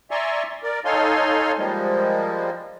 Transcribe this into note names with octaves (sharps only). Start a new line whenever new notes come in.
D5 E5 G#5 A#5 C6 C#6
A#4 D5
D#4 A4 C#5 F5 G#5 C6
F3 G3 G#3 A#3